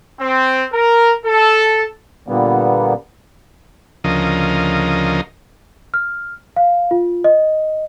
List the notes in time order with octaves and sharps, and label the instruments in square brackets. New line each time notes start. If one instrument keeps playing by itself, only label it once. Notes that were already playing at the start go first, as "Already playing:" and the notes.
[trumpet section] C4
A#4
A4
[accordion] A#2 D3 G3 A#3 B3
[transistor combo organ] D2 C#3 F3 A#4 D#5
[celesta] F6
F5
F4
D#5